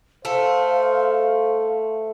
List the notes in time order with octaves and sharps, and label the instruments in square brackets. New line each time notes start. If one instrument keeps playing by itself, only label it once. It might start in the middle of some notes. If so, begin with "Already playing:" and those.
[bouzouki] A3 [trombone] C5 [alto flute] F5